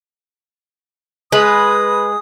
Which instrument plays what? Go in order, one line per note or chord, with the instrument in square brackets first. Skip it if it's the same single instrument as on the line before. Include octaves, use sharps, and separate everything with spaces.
[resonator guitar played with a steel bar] G#3 [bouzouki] B4 [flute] D#6